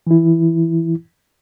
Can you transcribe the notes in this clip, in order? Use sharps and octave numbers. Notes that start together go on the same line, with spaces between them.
E3 E4